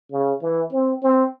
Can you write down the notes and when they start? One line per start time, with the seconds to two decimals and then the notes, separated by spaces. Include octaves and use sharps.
0.11 C#3
0.42 E3
0.72 C4
1.03 C4